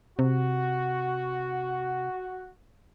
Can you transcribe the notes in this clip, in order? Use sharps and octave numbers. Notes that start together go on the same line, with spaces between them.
C3 F#4